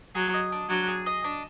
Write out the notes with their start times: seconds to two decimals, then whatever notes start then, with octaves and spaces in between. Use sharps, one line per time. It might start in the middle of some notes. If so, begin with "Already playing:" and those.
0.15 F#3 G#4
0.34 D#5
0.52 D4
0.69 F#3 D4
0.88 G#4
1.06 D#5
1.24 D4